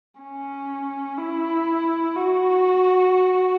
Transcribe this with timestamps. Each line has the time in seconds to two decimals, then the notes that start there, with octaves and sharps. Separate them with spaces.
0.21 C#4
1.18 E4
2.16 F#4